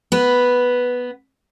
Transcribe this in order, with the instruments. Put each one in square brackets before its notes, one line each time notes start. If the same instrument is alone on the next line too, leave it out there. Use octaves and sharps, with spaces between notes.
[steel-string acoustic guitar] B3 B4